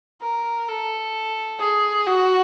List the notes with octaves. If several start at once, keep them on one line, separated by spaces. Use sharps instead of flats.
A#4
A4
G#4
F#4